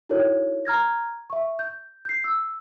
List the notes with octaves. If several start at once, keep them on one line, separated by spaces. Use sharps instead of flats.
D#4 E4 F#4 A4 A#4 C#5
A#5 F6 G#6 A#6
E5 C#6
G6
G6 C7
E6